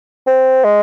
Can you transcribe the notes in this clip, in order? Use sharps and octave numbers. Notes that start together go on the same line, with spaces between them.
C4
G#3